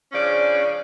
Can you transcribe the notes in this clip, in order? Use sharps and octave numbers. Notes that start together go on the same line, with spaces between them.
C#3 F3 C#4 D4 D5